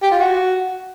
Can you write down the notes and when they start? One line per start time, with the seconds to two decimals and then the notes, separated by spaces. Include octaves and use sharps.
0.03 G4
0.11 F4
0.19 F#4